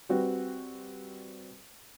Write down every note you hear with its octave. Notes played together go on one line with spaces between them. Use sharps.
G3 C4 F#4 B4